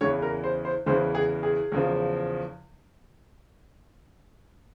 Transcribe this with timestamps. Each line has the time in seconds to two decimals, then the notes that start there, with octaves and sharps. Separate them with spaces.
0.01 E2 C#3 E3 C#5
0.22 A#4
0.44 C5
0.65 C5
0.86 E2 C#3 E3 C5
1.15 G#4
1.43 G#4
1.72 E2 C#3 F3